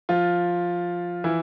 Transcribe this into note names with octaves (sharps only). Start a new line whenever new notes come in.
F3 F4
E3 E4